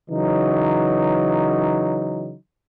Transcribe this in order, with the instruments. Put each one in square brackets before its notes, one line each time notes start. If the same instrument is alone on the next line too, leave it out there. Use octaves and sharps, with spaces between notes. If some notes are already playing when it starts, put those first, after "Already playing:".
[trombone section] C#3 E3 F#3 D#4